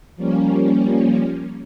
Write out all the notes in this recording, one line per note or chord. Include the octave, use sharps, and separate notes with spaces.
F3 G3 A#3 C#4